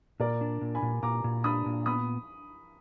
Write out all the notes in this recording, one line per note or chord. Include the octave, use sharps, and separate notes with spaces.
A#2 A#4 D5
D4
A#2
G#5 B5
A#2
A#2 A#5 D6
A#2
D4 B5 D#6
A#2
B3 B5 D#6